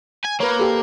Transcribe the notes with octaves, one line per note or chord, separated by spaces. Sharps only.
G#5
A#3 B4 C#5
G4 A4